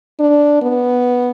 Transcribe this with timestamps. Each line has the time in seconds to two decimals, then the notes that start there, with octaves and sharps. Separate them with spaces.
0.20 D4
0.62 B3